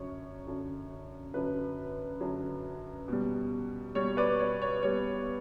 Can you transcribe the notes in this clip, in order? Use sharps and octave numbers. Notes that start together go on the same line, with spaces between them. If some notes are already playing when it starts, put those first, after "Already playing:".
Already playing: F#2 D3 F#3 C#5
F#2 D3 F#3
F#2 D3 F#3 B4
F#2 D3 F#3
B2 G3
B2 G3 C#5
B4 D5
C#5
C#5
B2 G3 C#5